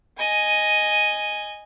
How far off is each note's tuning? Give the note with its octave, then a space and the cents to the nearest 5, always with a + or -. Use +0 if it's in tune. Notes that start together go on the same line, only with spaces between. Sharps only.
D#5 +0 G#5 +0